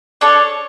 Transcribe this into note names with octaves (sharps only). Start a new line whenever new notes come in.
D4 A4 C#5